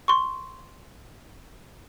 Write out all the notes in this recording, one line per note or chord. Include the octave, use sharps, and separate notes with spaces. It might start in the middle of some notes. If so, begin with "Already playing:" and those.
C6 C#6